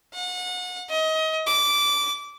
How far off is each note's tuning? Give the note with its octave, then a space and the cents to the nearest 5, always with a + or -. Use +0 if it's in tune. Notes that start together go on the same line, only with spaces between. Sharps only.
F#5 -35
D#5 +30
D6 -15